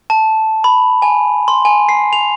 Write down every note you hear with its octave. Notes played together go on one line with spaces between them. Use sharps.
A5
B5
G#5
C6
G#5
C7
F7